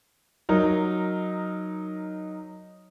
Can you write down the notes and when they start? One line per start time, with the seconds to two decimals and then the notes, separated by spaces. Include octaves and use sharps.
0.49 F#3 D#4 A#4